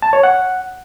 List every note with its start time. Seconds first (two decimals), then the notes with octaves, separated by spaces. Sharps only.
0.02 A5
0.13 C#5
0.23 F#5